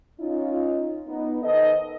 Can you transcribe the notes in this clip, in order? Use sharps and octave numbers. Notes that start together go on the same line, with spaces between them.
C#4 D#4 F4
B3 D#4
D#3 A4 B4 C5 D#5